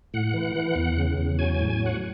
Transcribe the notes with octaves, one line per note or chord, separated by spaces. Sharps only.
A2 F#5
E3
E3
E2
C#3
E2
F#3 G#5
A2 G#5
G#5
F#3
F#5